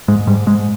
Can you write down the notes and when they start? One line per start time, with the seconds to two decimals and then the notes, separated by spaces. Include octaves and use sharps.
0.08 G#2 G#3
0.27 G#2 G3
0.46 G#2 G#3